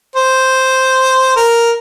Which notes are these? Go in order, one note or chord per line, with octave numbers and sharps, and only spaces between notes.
C5
A#4